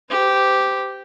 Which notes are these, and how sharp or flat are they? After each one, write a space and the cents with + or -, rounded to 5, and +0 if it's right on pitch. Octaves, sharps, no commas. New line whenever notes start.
G4 -5 C5 -35